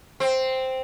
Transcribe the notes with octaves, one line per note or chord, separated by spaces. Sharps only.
C4